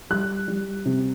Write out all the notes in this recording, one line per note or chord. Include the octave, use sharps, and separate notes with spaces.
G3 F#6
G3
C3